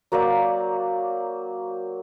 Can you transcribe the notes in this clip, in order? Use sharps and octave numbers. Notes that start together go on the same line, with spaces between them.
F#3 A#3 C5 D5